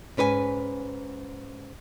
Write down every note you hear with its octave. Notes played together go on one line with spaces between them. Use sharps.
G#2 C#4 B4 C5 G#5